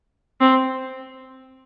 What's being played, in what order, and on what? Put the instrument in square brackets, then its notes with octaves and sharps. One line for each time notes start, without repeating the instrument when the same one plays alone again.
[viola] C4